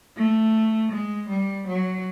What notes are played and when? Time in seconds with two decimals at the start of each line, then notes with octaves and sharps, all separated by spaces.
0.16 A3
0.92 G#3
1.29 G3
1.68 F#3